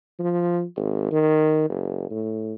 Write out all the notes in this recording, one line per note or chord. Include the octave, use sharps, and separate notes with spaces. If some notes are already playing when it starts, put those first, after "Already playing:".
F3
G#1
D#3
F#1
A2